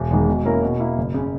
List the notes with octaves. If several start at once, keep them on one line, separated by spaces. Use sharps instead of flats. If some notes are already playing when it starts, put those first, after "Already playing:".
Already playing: E1
E2 D#3 G#3
B2
A#3 C#4 E4 A#4
B2
A#3 E4
F#1
C#3